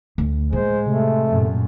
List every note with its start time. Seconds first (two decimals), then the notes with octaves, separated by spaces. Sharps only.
0.18 D2
0.53 A2 G#3 C5
0.86 C3 A3
1.27 F#2 A#2